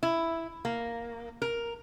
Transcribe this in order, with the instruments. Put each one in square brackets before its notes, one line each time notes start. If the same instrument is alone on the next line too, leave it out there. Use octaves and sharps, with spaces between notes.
[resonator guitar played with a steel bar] E4
A#3
A#4